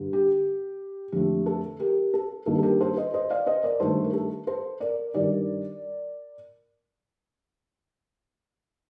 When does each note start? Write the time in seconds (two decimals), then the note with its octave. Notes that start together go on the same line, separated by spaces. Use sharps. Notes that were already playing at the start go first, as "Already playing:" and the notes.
Already playing: G2 D3 G3
0.13 G4
1.12 F2 D3 F3 A3 G4
1.46 A4
1.80 G4 A#4
2.14 A4
2.46 G2 D#3 A#3 A4
2.58 A4
2.63 G4 A#4
2.81 A4 C5
2.97 C5 D#5
3.14 C5 D#5
3.30 D5 F5
3.46 C5 D#5
3.64 A#4 D5
3.80 G2 D#3 A3 A4 C5
4.04 A#4
4.13 A4
4.47 A4 C5
4.80 A#4 D5
5.14 G2 D#3 G3 A#4 D5